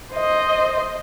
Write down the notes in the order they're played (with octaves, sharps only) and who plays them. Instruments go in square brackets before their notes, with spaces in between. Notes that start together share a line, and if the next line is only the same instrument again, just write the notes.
[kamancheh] C5 D#5